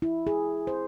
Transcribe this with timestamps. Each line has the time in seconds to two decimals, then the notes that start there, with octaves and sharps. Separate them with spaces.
0.02 E4
0.27 G#4
0.67 C5